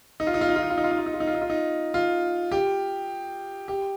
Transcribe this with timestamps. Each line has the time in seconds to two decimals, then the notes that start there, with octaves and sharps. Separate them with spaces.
0.20 D#4
0.27 F4
0.34 D#4
0.41 F4
0.49 D#4
0.56 F4
0.63 D#4
0.70 F4
0.77 D#4
0.84 F4
0.91 D#4
0.99 F4
1.06 D#4
1.14 F4
1.20 D#4
1.27 F4
1.35 D#4
1.42 F4
1.50 D#4
1.94 F4
2.52 G4
3.68 G4